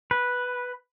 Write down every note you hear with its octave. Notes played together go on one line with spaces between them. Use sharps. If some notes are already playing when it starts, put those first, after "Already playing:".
B4